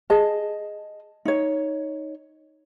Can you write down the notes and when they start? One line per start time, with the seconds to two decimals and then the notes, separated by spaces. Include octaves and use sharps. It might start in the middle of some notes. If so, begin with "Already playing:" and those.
0.10 G#4 D#5 A5
1.25 D#4 C#5